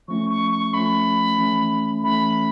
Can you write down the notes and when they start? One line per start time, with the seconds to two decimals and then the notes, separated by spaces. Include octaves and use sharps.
0.08 F3 A3 C#4 C#6
0.30 C#6
0.51 C#6
0.73 F3 A3 C#4 B5
1.37 E3 A3 C#4
2.03 E3 A3 C#4 B5